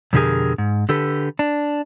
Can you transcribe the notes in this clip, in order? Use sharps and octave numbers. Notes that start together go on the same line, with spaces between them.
F2 B2 D3 G4 G#4 A#4
G#2
D3 G4 A4 B4
D4